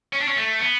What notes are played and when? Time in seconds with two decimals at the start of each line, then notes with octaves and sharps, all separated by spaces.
0.13 C#4
0.21 D4
0.28 C#4
0.36 A3
0.60 B3